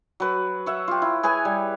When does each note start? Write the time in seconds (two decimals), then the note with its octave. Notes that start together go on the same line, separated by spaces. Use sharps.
0.20 F#3 B4
0.66 C#5 E5 F#5
0.88 F4 G4
1.02 E4
1.23 G#4 B4 C#5 G#5
1.45 G3